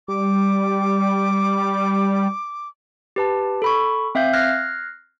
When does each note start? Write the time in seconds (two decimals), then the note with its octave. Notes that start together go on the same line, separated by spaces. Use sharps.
0.08 G3 D6
3.16 G4 B4 A5
3.62 A4 B5 C#6
4.15 C4 E5 F5 G6
4.33 F6 F#6 G#6 A#6 C7